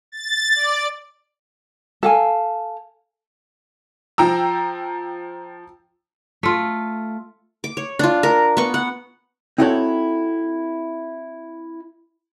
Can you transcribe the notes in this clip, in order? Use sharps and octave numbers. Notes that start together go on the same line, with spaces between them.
A6
D5
A4 F5 G#5
F3 G5 A#5 E6
A3 F4
D6
C#5
D4 F4
A#4
B3 C#6
F#5
C4 D#4 E4 F#4 A4 C#5